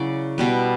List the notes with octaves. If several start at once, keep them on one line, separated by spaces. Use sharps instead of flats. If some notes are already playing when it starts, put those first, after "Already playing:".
Already playing: C#3 F#3 C#4 E4 D5
B2 G3 B3